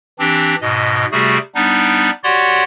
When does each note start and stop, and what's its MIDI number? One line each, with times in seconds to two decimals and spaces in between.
0.19 0.55 52
0.19 0.55 60
0.19 0.55 62
0.19 0.55 67
0.61 1.05 44
0.61 1.05 47
0.61 1.05 75
1.12 1.38 48
1.12 1.38 55
1.12 1.38 57
1.12 1.38 66
1.12 1.38 68
1.55 2.10 55
1.55 2.10 59
1.55 2.10 62
1.55 2.10 63
2.24 2.63 66
2.24 2.63 67
2.24 2.63 73
2.24 2.63 74
2.24 2.63 78
2.24 2.63 84